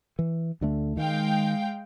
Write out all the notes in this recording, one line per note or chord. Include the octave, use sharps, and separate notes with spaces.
E3
D2 D3 A3
D#3 G#3 F5 G5